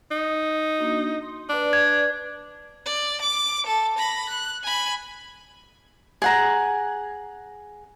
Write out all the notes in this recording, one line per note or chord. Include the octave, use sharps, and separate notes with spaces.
D#4
A#3 D4 F#4
C6
D4 B4 D5
G#6
D5
D6
A4
B5 A#6
F#6
G#5 B5
G#4 F#5 A#5